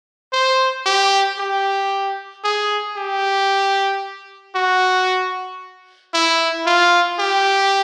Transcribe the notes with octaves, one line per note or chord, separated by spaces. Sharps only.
C5
G4
G4
G#4
G4
F#4
E4
F4
G4